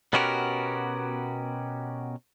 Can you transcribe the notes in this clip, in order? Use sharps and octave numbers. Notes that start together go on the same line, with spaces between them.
B2 B3 C#4 F#4 G4 A#4